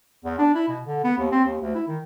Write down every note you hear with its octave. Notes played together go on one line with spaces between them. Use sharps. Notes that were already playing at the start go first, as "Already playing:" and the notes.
E2
D4
E4
B2
D3
B3
D#2
C4
D#2
D2
E4
D#3